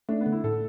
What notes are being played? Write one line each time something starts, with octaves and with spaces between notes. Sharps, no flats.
A3 D4
B3
D3
E4
A2 A4